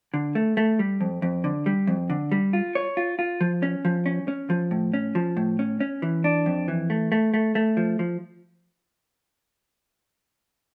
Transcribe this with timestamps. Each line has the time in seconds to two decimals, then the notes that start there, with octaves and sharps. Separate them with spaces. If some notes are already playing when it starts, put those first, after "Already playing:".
0.14 D3
0.35 A3
0.57 A3
0.79 G3
1.01 F2
1.22 F2
1.44 D3
1.66 G3
1.87 F2
2.10 D3
2.32 G3
2.53 F4
2.75 C#5
2.97 F4
3.19 F4
3.41 F3
3.63 C#4
3.85 F3
4.06 C#4
4.28 C#4
4.50 F3
4.71 A2
4.94 C#4
5.15 F3
5.37 A2
5.59 C#4
5.80 C#4
6.02 E3
6.24 D4
6.46 F2
6.68 E3
6.90 A3
7.12 A3
7.34 A3
7.55 A3
7.77 F3
7.99 F3